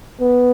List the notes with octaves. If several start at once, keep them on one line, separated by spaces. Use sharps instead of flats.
B3